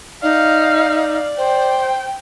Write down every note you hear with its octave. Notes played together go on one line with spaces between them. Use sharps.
D#4 D5 F5
C5 G5